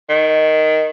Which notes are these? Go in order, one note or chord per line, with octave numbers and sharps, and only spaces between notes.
D#3